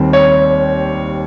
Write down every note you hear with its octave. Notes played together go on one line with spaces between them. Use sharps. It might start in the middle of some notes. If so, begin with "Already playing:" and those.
Already playing: D#2 D#3 G3 C4
C#5